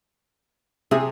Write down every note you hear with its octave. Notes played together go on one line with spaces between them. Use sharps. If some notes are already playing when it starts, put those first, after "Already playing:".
C3 G#4